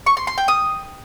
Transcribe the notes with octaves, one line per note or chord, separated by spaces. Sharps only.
C#6
C6
C6
G5
D#6